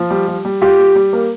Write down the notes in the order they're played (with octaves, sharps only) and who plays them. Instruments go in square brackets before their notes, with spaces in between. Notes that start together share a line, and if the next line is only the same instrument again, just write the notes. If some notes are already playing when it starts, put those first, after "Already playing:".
Already playing: [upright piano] F3
G3
G3
G3
[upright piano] F4 [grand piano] G4
[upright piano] G3
G3
A#3